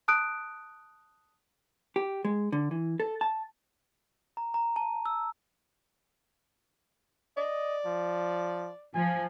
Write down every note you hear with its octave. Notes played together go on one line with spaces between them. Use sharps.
A5 D#6 F#6 D7
G4
G#3
D3
E3
A4
A5
A#5
A#5
A5
E6
D5 D#5
F3
F3 G#5